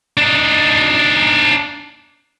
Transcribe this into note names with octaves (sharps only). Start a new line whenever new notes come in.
D4 D#4